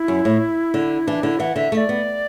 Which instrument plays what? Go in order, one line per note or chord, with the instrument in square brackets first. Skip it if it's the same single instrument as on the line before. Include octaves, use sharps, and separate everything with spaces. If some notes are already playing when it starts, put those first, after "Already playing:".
Already playing: [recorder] E4
[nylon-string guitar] F#2
A2
D3
[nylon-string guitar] E3 [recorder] D4
[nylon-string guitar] D3 [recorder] E4
[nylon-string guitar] E3 [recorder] F#5
[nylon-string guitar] D3 [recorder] E5
[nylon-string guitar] A3 [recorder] E5
[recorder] D5
[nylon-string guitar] B3